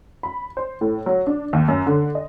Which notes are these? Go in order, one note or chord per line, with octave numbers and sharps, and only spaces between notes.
B5
C5
A2
F#3
D4
D#2
F#2
D3
D#5